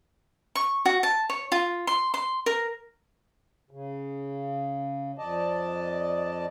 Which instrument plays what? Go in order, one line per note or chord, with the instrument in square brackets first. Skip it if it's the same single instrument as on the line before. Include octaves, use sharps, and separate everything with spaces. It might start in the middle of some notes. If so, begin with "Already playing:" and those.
[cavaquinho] C#6
F#4
A5
C#5
F4
C6
C6
A#4
[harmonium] C#3
F2 D5 D#5 A5